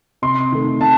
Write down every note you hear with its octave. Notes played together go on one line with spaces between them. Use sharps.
C3 C6
D#3 A3
C3 A5